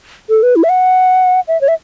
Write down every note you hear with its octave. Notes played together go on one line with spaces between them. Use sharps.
A4
B4
E4
E5
F#5
E5
C#5
E5